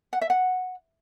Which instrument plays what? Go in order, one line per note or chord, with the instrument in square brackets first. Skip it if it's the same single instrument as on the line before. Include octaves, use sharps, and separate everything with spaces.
[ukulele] F#5
E5
F#5